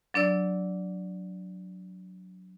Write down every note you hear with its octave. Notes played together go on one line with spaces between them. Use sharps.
F#3 D4 D5 E6